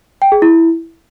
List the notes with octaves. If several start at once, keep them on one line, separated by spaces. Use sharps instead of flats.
G5
G#4
E4